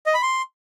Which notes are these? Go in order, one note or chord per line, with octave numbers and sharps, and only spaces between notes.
D#5
B5
C6